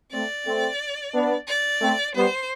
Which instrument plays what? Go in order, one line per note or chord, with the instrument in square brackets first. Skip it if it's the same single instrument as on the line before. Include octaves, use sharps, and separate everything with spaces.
[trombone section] A3 C4 [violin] D5
[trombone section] A3 C4
B3 D4
[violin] D5
[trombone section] A3 C4
[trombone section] G3 B3 [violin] C5